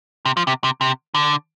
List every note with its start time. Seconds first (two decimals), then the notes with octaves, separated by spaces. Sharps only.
0.25 C3
0.37 F3
0.47 C3
0.64 C3
0.81 C3
1.15 D3